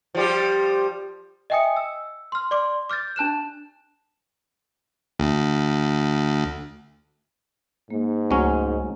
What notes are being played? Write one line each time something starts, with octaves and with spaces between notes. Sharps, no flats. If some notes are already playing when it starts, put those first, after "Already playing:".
F3 G3 G4
D#5 E5 G5 G#5 D#6 C#7
E6
C6 F6
D5 C6 D6
D6 F6 G6 A6
D4 A5 F#6 E7
D2
G#2 A#3
C#2 F#3 A3 C#4